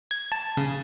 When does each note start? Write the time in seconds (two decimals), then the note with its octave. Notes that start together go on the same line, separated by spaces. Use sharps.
0.11 G#6
0.32 A5
0.57 C#3